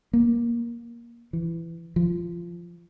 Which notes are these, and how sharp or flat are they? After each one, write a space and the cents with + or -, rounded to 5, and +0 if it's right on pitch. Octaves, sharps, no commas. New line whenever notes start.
A#3 +15
E3 +15
F3 -15